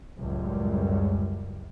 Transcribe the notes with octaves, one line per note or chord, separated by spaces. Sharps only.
C#2 F#2 A2 G3